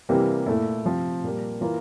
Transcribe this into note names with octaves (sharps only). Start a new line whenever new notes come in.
C3 E3 G3 A#3
A#2 A3 E4
C3 F3 C4
A#2 G3 A#3
E3 A#3 F4 A#4